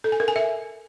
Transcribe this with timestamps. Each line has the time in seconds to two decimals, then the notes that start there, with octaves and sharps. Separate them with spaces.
0.04 A4
0.12 G#5
0.20 A#4
0.28 G#5
0.36 E5